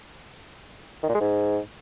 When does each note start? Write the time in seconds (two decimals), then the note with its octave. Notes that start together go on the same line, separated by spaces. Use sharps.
1.03 D#3
1.09 A#2
1.15 G#3
1.20 G#2